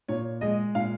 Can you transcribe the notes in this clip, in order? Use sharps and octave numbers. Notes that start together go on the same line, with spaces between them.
A#2 C#5
G#3 D#5
A#2 F5